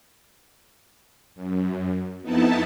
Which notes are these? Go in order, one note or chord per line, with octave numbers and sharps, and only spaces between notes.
F#2
F2 B3 D#4 E4 A5